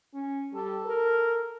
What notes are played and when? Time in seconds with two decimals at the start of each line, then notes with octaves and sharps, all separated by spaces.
0.14 C#4
0.53 G3 A4
0.85 A#4